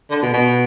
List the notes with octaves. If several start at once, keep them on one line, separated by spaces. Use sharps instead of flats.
D3
B2
B2